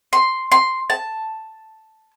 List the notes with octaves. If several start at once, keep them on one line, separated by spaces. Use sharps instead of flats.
C6
C6
A5